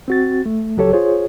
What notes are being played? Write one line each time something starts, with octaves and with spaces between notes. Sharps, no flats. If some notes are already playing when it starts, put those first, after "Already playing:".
C4 F#4 A6
A3
C#2 F#3 G4 A4 C#5
F4 G#4 C5 C#5